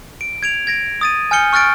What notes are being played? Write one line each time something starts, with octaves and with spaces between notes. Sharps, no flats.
D7
G#6 D7 F7
G#6 A#6 D7
D#6 A6 D#7
G#5 F6 G6 C#7 G7
C#6 F6 F#6 A6 D7